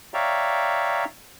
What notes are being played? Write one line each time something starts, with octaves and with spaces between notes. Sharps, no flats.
C#5 D5 E5 F5 G5 A#5